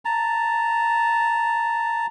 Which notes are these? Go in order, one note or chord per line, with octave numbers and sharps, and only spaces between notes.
A5 A#5